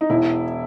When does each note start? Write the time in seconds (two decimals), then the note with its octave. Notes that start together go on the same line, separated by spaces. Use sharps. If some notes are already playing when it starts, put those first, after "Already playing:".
0.01 D#4
0.10 E1 E4